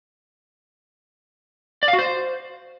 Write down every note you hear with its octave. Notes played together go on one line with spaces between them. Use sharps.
D5
F5
F#4
C5